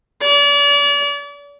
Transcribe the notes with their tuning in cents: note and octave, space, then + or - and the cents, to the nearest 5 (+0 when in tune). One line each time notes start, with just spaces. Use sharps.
D5 -40